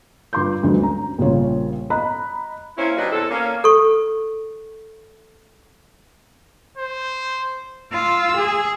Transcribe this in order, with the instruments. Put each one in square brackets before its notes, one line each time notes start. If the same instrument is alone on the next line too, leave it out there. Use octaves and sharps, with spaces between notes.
[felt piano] G2 F4 C6 D6 G6
D2 G2 D3 F#3 G#3
C#4 A#5
A#1 C#3 G3 F4 C#5
D#5 A#5 B5 F#6
[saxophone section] A#3 C4 C#4 E4
C3 F#3 D4 D#4 B4
E2 C4 A4
A#3 C#4
[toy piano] A4 C#6
[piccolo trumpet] C5
[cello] F4 [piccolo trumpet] E6
[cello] G#4